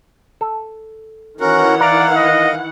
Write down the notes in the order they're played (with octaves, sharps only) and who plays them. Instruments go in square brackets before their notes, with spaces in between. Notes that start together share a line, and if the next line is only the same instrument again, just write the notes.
[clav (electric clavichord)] A4
[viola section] D#3 E3 F#5 [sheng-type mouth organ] C#4 F#4 A#4
[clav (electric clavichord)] A#4 A#5 [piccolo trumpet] D5 [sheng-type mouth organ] F5
[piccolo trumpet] D#5